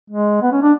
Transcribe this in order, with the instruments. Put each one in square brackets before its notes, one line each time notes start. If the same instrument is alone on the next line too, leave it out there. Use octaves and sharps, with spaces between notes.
[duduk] G#3
B3
C#4
D4